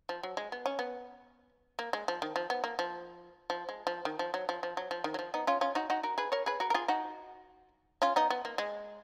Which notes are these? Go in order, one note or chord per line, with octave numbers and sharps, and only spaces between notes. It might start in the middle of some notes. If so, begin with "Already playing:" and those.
F3
F#3
G#3
B3
C#4
B3
A#3
G#3
F3
D#3
F3
B3
A#3
F3
F3
G#3
F3
D#3
F3
F#3
F3
F3
F#3
F3
D#3
F#3
F3
B3 D#4
C#4 F4
C#4 F4
D#4 F#4
D#4 F#4
F#4 A#4
G#4 B4
A#4 C#5
G#4 B4
F#4 A#4
A#4
F4 G#4
D#4 F#4
C#4 F4
B3 D#4
B3
A#3
G#3